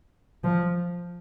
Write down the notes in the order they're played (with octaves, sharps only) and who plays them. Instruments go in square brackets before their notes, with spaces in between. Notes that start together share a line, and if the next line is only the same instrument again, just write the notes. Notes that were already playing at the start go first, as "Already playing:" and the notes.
[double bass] F3